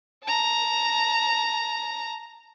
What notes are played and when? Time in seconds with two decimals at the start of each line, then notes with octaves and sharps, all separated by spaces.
0.24 A5 A#5